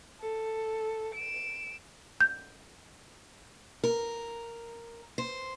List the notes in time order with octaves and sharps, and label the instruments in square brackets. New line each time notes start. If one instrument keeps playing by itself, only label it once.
[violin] A4
D7 E7
[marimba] G6
[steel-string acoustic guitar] A#4
C5